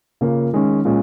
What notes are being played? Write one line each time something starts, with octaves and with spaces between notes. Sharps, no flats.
C#3 A#3 F4
D#3 G#3 C#4
A#2 G#3 C#4